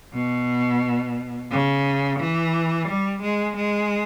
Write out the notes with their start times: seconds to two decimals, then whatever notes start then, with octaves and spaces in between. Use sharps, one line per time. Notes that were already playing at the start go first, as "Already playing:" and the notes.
0.14 B2
1.51 C#3
2.19 E3
2.88 G3
3.22 G#3
3.56 G#3